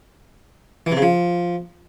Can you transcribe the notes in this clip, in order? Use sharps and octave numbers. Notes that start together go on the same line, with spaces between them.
E3
C3
C#3
F3